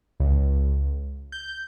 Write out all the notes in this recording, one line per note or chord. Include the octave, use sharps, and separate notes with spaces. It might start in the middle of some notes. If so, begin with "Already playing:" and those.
C#2
G6